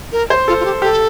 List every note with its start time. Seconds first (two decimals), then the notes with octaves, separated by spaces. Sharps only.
0.12 A#4
0.30 C5
0.48 F4 A4
0.60 F4
0.65 G4
0.82 G4 A4